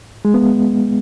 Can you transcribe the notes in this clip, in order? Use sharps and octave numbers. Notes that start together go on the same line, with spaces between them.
G#3
B3